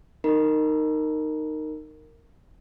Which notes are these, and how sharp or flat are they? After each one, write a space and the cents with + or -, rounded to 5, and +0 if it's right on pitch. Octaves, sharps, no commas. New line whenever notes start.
D#4 -10 A#4 -15 A#5 +45